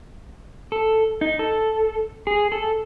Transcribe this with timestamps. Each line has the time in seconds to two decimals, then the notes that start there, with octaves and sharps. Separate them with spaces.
0.72 A4
1.21 D#4
1.39 A4
2.27 G#4
2.52 A4